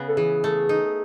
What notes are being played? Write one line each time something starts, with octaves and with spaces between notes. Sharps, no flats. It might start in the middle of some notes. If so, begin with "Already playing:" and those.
Already playing: C#3 B3
A4
E3 G#4
A3
D#4